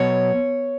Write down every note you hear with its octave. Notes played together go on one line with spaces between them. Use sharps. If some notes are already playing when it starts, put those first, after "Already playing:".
Already playing: B2 F#3 C#5